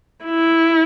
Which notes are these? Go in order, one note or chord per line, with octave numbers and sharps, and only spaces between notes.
E4